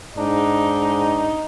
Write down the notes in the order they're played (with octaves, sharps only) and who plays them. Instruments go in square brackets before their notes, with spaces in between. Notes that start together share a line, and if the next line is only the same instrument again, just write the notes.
[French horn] G#2 [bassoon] D4 [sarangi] D#4